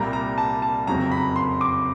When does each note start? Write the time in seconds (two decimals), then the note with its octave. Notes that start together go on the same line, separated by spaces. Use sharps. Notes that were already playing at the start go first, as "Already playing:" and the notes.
Already playing: C2 A#2 G3 A#5
0.13 A#5
0.38 A5
0.62 A5
0.87 F#1 F2 C#3 F#3 A#5
1.12 B5
1.36 C6
1.61 D6